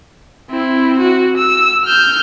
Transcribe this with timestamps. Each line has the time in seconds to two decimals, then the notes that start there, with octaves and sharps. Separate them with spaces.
0.50 C4 E4
0.99 F#4
1.37 E6
1.85 F6 G6